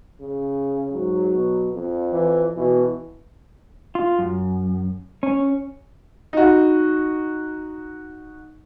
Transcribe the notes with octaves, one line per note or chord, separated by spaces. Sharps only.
C#3
G#2 F#3
B2
F2
E3
B2 E3
F4
F#2
C#4
D#4 F#4